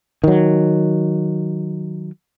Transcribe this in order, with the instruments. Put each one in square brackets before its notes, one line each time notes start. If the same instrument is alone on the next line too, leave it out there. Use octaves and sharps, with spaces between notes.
[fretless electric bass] D#3 F#3